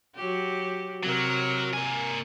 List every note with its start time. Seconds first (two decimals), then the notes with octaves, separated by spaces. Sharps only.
0.16 F#3 F#4 G4
1.03 C3 F#3 A#4
1.74 A#3 G#5